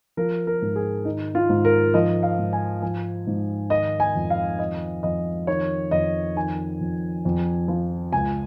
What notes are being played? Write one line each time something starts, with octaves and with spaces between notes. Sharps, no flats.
F3 A#4
A#4
G#2
G#4
D#3 D#4
F4
G#2
A#4
F3 D#5
F5
G#2
G#5
F3 G#5
G#2
D#3 D#5
G#5
F2
F5
D#3 D#5
F2 D#5
D#3 C#5
F2 D#5
D#3 G#5
F2
F2
F3
C#2 G#5